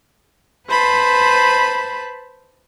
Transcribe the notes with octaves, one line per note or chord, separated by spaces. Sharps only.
B4 C5 A5 B5